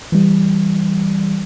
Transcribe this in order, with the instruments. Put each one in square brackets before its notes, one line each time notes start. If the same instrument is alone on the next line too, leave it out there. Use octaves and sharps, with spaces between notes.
[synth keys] E3 G3